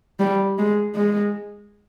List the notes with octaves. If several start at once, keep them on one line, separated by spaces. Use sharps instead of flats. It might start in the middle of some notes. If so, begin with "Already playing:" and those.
G3
G#3
G#3